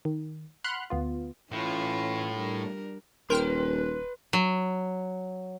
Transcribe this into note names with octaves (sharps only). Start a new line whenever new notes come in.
D#3
F#5 B5 C6 F6 F#6
D2 B3 F4
A2 E3 C#4 F4
G3 D4 A#4
D#1 A#4 B4 G5 C6 F6
F#3